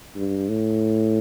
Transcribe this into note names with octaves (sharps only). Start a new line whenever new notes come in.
G2
A2